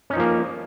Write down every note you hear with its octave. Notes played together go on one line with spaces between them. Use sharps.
F3 A#3 C#4 D#4